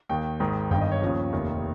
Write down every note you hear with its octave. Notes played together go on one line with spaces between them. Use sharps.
D#2 D#3 G5
G#1 G#2 D#3
G1 G2 D#3 G5
D#5
C#5
D#2 C#3 F3
F1 D#2 D#3